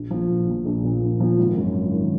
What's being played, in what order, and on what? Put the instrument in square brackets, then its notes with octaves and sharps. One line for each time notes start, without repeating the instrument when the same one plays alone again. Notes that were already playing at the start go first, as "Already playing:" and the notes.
Already playing: [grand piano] A#1
A#2 F3
A#1
A#2 F3
A#1
A#2 F3
A#1
A#2 F3
G#1
F#2 D#3
G#1
D#3